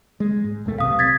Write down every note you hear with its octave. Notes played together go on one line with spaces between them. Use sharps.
G#3
G#2
A#1 D#2 A3
B1 C3 F5 D#6
G#6 A6 B6